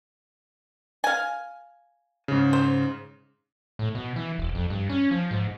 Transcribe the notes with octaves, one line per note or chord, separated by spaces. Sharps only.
F5 G#5
G#2 C#3
C5
A2
B2
E3
E1
F2
G2
C#4
F3
G#2